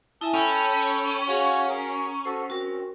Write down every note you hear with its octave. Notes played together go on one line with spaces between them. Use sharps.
E4 E5 G#5 A5 D#6
C#4 A4 G5 A5 B5
F#4 G#4 C#5 F5 G#5
F#4 G#4 A#4 A#5
F#4 A4 C5
C4 F#4 A#4